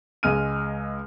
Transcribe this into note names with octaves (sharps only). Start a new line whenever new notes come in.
C#2 G#3 F6 D#7